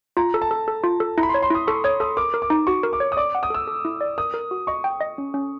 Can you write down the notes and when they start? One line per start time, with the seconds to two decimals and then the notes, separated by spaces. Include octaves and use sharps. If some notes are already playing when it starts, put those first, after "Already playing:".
0.17 F4 A#5
0.34 A4
0.42 A5
0.51 A4
0.68 A4
0.84 F4
1.00 A4
1.18 E4 A#5
1.23 B5
1.29 C6
1.34 C#5
1.42 C6
1.50 E4 D#6
1.67 A4 C#6
1.84 C#5 D#6
2.00 A4 D#6
2.17 A#4 D6
2.34 A#4
2.42 D6
2.50 D#4
2.67 F#4 C#6
2.83 A#4
2.93 D6
3.00 C#5
3.12 D#6
3.17 D5 D6
3.35 F#5
3.43 D#6
3.50 A4 E6
3.67 A4
3.85 E4
4.01 D5
4.18 A#4 D#6
4.34 A#4
4.51 F#4
4.67 D#5 C#6
4.84 G5
5.01 D#5
5.18 C#4
5.34 C#4